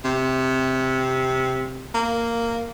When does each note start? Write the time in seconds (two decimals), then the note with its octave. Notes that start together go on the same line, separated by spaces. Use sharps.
0.05 C3
1.95 A#3